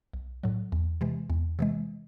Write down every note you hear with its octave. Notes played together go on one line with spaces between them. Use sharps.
B1
A2 F#3
E2
C3 E3 G#3
E2
C3 E3 G#3